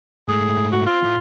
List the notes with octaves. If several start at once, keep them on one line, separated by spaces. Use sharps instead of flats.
G#2 A3 G#4
F#4
C4 F4
A2